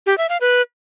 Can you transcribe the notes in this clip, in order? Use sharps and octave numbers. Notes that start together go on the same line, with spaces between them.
G4
E5
F5
B4